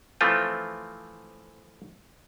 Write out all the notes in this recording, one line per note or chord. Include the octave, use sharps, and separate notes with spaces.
E3 F3 A3 C4 F4